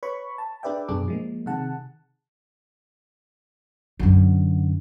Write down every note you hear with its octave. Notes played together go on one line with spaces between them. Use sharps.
B4 C#5 B5 C#6
A5
D4 G#4 B4 D5 E5 G5
F#2 B2 D4 G#4 A4 D6
F3 G#3 A#3
C3 D#3 G#4 F#5 A5
F#2 D3